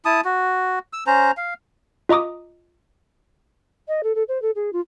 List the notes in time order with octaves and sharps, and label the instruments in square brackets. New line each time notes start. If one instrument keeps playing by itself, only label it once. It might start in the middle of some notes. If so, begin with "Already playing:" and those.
[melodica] E4 A5 D#6
F#4
E6
C#4 C5 A#5
F5
[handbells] F4 D#5 A#5 D6 D#6
[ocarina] D#5
A4
A4
C5
A4
G#4
F4